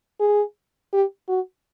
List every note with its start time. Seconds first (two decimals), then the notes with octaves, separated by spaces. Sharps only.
0.20 G#4
0.93 G4
1.29 F#4